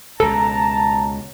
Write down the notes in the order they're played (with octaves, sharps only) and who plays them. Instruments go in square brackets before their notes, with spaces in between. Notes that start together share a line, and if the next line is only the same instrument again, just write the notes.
[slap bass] C#2 B2 [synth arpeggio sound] A4 [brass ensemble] A5 [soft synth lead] A#5